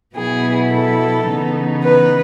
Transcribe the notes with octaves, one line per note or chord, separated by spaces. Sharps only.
B2 F#3 B3 E4 G#4
A4
C#3 E3 B3 D#4
B4